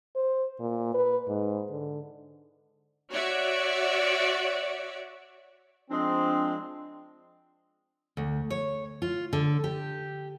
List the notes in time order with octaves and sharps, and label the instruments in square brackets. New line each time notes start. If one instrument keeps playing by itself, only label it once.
[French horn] C5
A#2
B4
G#2
D3
[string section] F#4 C#5 D5 E5
[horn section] F3 G#3 C4 [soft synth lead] D4
[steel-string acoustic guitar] D2
C#5
F4
D3
G4